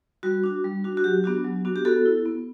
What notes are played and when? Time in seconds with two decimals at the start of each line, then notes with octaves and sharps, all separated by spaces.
0.23 G3 F#4
0.44 D4 F#4
0.64 G3
0.84 D4 F#4
0.97 F#4
1.04 F#3 G4
1.24 B3 D4 F#4
1.44 F#3
1.65 B3 D4 F#4
1.76 G4
1.85 B3 F#4 A4
2.06 E4
2.25 B3